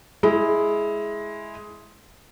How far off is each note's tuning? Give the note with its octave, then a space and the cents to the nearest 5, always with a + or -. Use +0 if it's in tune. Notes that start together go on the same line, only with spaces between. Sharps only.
G#3 +10 E4 +0